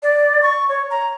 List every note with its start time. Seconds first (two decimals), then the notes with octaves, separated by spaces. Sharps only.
0.03 D5
0.42 C#6
0.69 C#5
0.90 A#5